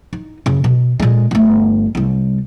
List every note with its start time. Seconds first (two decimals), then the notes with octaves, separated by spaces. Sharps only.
0.13 D#4
0.46 F#2 C#3
0.64 B2
1.00 A#2 G#3
1.31 G1 A3
1.95 C2 G3